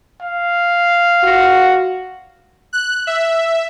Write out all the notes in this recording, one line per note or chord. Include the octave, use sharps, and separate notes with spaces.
F5
A#2 F4 F#4
F#6
E5